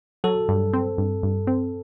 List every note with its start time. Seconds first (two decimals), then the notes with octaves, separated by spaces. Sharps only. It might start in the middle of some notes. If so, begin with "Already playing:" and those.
0.24 F#3 A4
0.49 G2
0.73 C4
0.98 G2
1.23 G2
1.47 C4